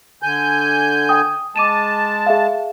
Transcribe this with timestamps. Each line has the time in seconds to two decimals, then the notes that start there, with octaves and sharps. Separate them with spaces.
0.23 D3 G#5 G6
1.09 G5 D#6
1.56 G#3 A5 D6 D#7 E7
2.26 G#4 E5 F5